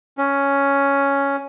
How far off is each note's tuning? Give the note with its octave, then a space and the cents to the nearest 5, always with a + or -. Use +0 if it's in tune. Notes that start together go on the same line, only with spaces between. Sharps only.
C#4 +5